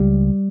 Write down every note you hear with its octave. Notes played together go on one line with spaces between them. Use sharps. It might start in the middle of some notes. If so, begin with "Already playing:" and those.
Already playing: C#2 G3